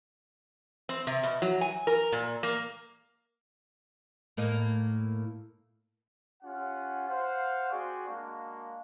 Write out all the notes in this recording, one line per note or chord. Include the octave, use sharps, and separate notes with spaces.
C4
C3
B2
F#3
G#5
A#4
A#2
A#3
A2 A#3 D#5
C#4 F4 G4 F#5
C5 F5 F#5
C4 F#4 G#4 D5 C6 C#6
G#3 A#3 D4 F#4 F5